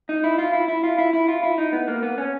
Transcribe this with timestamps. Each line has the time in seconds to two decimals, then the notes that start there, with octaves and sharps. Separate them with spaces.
0.09 D#4
0.24 E4
0.38 F4
0.53 E4
0.68 E4
0.83 F4
0.98 E4
1.13 E4
1.28 F4
1.43 E4
1.58 D#4
1.73 B3
1.88 A#3
2.03 B3
2.18 C#4